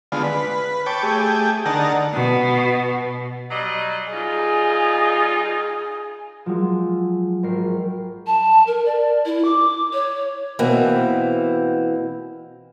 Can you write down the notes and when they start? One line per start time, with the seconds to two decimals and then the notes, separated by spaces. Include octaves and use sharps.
0.12 D3 G#3 B3 F4
0.23 B4
0.86 C#5 G5 A5 D6
1.03 A3 G4 G#4
1.66 D3 D#4 A#4 F#5 A5
2.14 B2
3.51 F#3 G3 D#5
4.12 G3 D#4 F4 G#4
6.46 F3 F#3 G#3
7.43 G#1 A#4 C7
8.26 A5
8.67 A#4
8.85 D5
9.25 E4
9.44 D6
9.93 C#5
10.59 B2 E3 A#3 C4